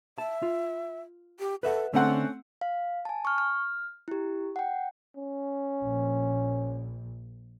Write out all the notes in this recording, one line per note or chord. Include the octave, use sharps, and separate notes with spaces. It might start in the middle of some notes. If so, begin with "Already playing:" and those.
E5 A5
F4
G4
A4 B4 E5 F#5
D3 A3 C4 C#4 F#5
F5
G#5 A5
C#6 F6
F6
E4 G4
F#5 G5
C#4
A#1